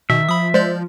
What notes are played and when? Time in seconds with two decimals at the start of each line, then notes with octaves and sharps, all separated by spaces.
0.10 B2 D#3 E5
0.29 F3 B5 D#6
0.54 G#3 C5 D5 G6